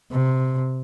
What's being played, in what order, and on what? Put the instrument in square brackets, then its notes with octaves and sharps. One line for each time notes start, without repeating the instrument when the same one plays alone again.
[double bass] C3